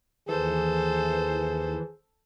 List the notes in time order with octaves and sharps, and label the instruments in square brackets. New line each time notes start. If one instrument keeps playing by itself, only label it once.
[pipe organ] D#2 [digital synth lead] E3 [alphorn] G#4 [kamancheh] A4 C5